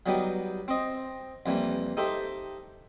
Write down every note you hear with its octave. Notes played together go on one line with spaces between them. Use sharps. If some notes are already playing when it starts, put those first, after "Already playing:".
F#3 G3 B3 D#4 G4
C4 D#5
F2 E3 G3 A#3
D#4 G4 A4 C5 E5